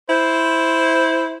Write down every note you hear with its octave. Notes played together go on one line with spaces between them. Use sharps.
E4 C5